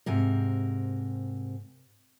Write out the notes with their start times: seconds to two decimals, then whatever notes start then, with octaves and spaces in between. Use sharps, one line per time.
0.06 G#2 C3 A#4